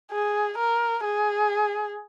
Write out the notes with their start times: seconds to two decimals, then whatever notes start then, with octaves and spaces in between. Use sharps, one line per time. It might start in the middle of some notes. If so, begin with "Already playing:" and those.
0.11 G#4
0.58 A#4
1.04 G#4